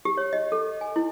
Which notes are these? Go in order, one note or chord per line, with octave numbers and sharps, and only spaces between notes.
G4
C#5
D#5
A4
G#5
E4